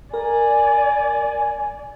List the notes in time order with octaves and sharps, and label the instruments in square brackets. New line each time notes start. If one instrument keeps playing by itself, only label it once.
[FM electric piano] A#4 [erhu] D5 [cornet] G#5